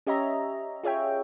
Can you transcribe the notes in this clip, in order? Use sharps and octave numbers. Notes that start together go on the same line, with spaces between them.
C#4 G4 C#5 D#5 E5 A#5
F4 G#4 C#5 E5 G5